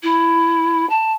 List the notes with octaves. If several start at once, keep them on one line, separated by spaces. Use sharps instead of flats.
E4
A5